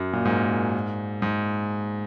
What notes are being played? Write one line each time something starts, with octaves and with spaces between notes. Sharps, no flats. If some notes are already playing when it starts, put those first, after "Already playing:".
Already playing: F#2
A#2
G#2
G#2